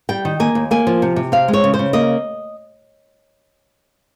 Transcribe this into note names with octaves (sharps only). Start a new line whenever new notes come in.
G3 G5
D#3
A#3 G#5
D#2
A#3 G#5
F3
C3
C3
C4 F5
G#3
C#5
C#3
C5
C#3
A#3 D#5